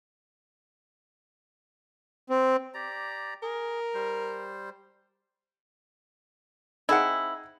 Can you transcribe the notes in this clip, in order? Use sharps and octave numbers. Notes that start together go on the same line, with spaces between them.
C4
G4 D5 A#5
G#4 A#4
G3 C5
C4 D#4 E4 G#4 F#5